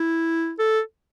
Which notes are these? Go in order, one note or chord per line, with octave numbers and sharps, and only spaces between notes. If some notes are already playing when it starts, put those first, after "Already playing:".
Already playing: E4
A4